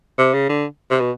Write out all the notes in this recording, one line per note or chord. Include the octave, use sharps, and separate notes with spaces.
C3
C#3
D3
C3
B2